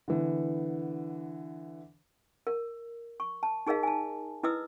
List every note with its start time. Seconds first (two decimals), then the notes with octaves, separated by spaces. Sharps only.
0.08 D3 E3 B3
2.47 A#4
3.20 C#6
3.43 A5
3.67 D#4 G#4 A#4 D#5 F5
3.83 G#5 A5
4.43 E4 B4 D#5 D#6 E6